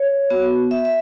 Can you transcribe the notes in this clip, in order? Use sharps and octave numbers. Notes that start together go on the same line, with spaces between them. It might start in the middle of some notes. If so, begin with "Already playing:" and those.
Already playing: C#5
B3 F#4
E5
E5